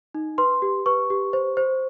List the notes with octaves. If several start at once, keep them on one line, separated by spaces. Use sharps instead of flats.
D#4
B4 C6
G4
B4 C#6
G4
C5
C5